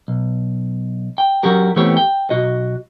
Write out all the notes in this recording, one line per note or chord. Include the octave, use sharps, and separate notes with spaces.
B1
G5
F#3 C#4 F#4 G4 A#4
E3 A3 B3 C4 G4 C#5
G5
B1 F#4 D#5